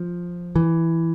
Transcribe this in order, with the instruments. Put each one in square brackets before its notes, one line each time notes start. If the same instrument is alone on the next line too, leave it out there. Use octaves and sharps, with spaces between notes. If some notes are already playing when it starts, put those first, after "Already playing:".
Already playing: [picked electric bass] F3
E3